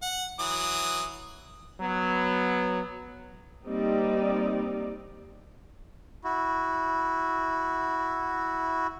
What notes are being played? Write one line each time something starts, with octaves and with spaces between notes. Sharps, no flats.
F#5
E3 F#3 D#6
F#3 B3
G3 A#3 C4 D#4 D5
E4 F#4